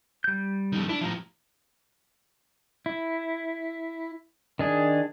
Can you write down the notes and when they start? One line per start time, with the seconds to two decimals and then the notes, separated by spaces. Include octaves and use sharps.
0.24 G3 G6
0.72 F2 D#3
0.89 D4 E4
1.01 A2 F3 E4 G4 A#5
2.86 E4
4.59 D#3 D4 G#4